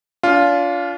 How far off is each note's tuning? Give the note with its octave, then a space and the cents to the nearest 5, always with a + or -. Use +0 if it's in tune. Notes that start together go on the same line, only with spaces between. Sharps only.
D4 -40 F4 +0